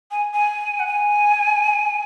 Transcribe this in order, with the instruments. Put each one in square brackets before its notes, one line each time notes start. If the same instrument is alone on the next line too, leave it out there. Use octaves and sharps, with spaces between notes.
[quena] G#5
G#5
F#5
G#5